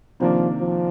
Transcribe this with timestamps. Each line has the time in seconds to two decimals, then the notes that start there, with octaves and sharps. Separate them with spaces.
0.20 C3 D#3 F3 A#3 D4
0.61 F3